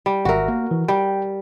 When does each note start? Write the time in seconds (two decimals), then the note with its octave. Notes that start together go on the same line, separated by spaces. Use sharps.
0.06 G3
0.25 G#1 F#4 A#4 E5
0.48 A#3
0.71 E3
0.88 G3 G5